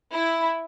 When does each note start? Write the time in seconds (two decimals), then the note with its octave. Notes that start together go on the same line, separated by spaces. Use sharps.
0.12 E4